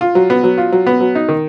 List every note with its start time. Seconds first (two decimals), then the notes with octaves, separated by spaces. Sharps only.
0.01 F4
0.15 F#3
0.30 B3
0.44 F#3
0.58 F4
0.72 F#3
0.86 B3
1.00 F#3
1.15 D#4
1.28 D#3